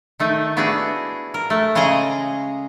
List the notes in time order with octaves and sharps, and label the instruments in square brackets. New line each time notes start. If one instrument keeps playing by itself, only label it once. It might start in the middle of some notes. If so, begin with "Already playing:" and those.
[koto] D#3 A3 D#4
B3 D4 E4 F#4 G#4
A#4
A3
C#3 G#3 G#4 D#5 A#5